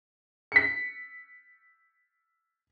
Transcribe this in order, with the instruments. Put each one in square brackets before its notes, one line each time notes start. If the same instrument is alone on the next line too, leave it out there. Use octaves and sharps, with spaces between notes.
[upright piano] B6 C#7